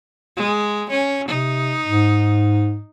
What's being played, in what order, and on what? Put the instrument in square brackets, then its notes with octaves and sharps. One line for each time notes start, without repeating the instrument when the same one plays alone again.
[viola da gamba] G#3
C#4
[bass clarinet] C3 [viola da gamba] D#4
[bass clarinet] G#2